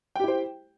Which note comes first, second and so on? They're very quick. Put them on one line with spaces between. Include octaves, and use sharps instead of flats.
G5 G4 E4 C5